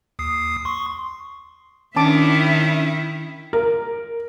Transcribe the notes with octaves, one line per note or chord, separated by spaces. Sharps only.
D#2 D#6 C7
C6 C#6
D#3 C#4 D4 E4 E5 A5 D6
A#4